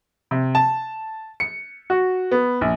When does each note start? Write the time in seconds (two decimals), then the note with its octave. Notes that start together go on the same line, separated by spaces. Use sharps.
0.31 C3
0.55 A5
1.40 C#7
1.90 F#4
2.31 B3
2.61 A#1